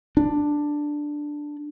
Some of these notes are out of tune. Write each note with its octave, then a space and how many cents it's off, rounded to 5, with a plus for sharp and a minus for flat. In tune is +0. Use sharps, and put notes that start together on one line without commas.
D4 +5